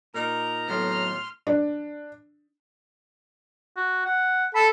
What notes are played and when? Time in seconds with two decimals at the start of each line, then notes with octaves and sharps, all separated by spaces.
0.14 A#2 D#4 A#4 A#5
0.68 D#2 A2 F#3 B3 C6 F6
1.47 D4
3.76 F#4
4.06 F#5
4.55 A4 B5